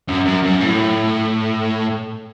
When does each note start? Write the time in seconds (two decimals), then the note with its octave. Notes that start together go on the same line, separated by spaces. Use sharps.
0.08 F#2
0.26 F#2
0.43 F#2
0.61 A2